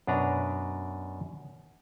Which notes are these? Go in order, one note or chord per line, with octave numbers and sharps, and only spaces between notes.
F#2 B2 D4 B4 A#5